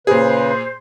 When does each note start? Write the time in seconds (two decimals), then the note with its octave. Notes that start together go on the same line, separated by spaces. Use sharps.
0.07 A#2 C#3 G#4 B4 C5